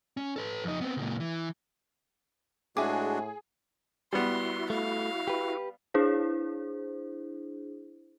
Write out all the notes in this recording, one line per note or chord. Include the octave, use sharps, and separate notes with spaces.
C#4
A4 B4
F2 D#4
B3 C4
C#2 A#2
E3
A2 G#3 D4 F#4 G#4 E5 G#5 D6
G3 B3 E4 F#4 C6
A3 F5
G4 B4
D4 E4 G#4 C5